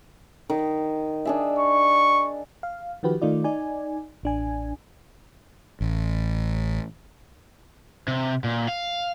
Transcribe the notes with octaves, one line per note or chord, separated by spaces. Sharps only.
D#3
D4 G#4 E5
C#6
F5
D#3 F3 F#4 G4 B4
D#3 A3 D#4 F4 D5
D#4 D5 G#5
A1 D4 G#5
A1
C3
A#2
F5